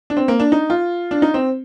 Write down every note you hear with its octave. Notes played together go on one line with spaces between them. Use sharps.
D4
C4
A#3
D4
D#4
F4
D4
D#4
C4